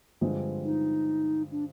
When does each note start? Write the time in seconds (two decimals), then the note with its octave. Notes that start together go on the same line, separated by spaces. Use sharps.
0.21 G2 D3 F3 G#3 C4
0.64 D#4
1.51 D4